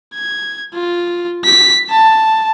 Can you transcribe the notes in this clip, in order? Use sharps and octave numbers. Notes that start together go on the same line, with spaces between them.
G#6
F4
B6
A5